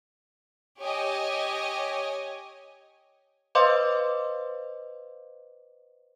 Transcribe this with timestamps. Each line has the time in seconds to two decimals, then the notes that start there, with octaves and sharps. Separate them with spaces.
0.80 G4 C#5 D#5 G#5
3.55 B4 C5 D#5 F5 C6 D6